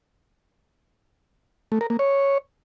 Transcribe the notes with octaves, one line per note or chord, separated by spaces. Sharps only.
A3
A#4
A#3
C#5